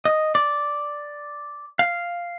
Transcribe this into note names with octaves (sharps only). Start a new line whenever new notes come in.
D#5
D5
F5